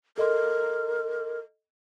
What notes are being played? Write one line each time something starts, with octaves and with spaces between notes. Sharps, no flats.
A4 A#4 D#5 C6